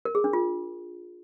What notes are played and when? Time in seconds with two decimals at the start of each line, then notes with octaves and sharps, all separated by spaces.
0.05 A#4
0.15 G#4
0.24 D4
0.33 F4